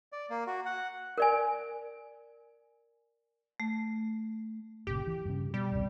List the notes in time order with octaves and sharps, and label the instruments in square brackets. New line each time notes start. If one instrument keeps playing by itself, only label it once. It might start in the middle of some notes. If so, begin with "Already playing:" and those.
[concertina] D5
A#3
F#4
F#5
[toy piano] A#4 D5 G#5
[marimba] A3
[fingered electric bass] G1 A#2 C#3 [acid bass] G4
[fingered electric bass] E3
G2 C#3
[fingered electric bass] B2 [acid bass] G3
[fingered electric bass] D1 G#1 C3